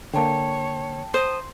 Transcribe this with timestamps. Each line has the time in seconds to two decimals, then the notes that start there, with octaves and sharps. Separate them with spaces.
0.14 D3 A#3 C#5 G5 A5
1.14 C5 C6 D#6